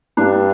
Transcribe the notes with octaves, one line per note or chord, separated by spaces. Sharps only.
G2 D4